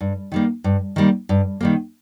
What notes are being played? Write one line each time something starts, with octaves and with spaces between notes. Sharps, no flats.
G2
D#3 G3 A#3
G2
D#3 G3 A#3
G2
D#3 G3 A#3